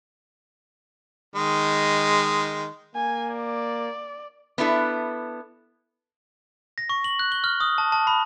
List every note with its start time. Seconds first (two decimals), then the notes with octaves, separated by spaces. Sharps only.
1.35 D#3 G#3
2.95 A#3 G#5
3.33 D5
4.58 B3 D4 E4 A4
6.78 A#6
6.89 C#6
7.04 F#7
7.19 F#6
7.32 G7
7.44 F6
7.60 D#6
7.78 A5
7.92 A5
8.07 B5